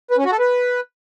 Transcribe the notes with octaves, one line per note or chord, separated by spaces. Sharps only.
B4
C#4
F#4
A4
B4